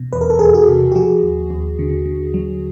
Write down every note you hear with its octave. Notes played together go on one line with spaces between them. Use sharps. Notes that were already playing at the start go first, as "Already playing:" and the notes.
Already playing: B2
E2 B4
A#4
A4
E2 G#4 A#4
F#4 G#4
C3
G4
F3 F#4 G#4
D#2
D#2
D3
D3
F#3